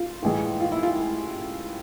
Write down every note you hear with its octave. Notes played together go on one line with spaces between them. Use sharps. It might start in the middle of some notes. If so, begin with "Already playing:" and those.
Already playing: F4
A2 E3 G#3
F4
E4
F4